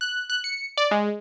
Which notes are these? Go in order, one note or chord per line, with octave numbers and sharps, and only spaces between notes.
F#6
F#6
C#7
D5
G#3